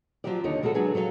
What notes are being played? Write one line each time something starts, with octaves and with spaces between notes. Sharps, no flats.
F3 F#3 D#4 F4 G4 D5
D#2 D3 D#4 C#5
D2 G#3 F4 F#4 A4
F#3 D4 G#4 B4
F#3 A4 B4 F5